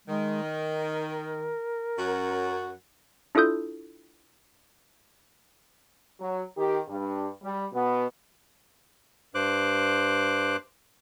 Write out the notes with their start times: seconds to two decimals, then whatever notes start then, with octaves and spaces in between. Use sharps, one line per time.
0.08 D#3 G#3
0.42 A#4
1.98 F#2 F#4
3.35 D4 E4 F4 A4 D#6 G6
6.19 F#3
6.56 D#3 G4
6.87 G2
7.41 G3
7.71 B2 B3
9.35 G2 C5 D6 F#6